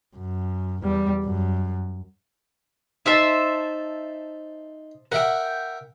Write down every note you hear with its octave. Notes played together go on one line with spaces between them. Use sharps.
F#2
E2 G3
F#2
D#4 C5 E5 A5
A#4 E5 F#5 G5